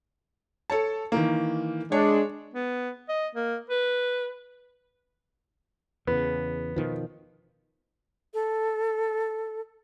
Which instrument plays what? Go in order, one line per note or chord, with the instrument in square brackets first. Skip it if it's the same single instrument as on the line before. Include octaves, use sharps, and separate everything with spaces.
[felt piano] A4 C#5 A5
D#3 E3 A#3
[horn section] G#3 D4 [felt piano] C#5
[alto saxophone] B3
D#5
A#3
B4
[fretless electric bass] E2 C#3 [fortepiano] B3
[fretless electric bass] B2 D#3 F3
[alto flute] A4